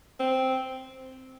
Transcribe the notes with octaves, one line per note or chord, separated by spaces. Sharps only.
C4